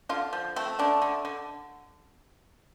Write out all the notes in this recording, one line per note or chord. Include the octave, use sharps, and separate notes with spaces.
D3 F4
F3
A3 C4
D3 D4
D3
D3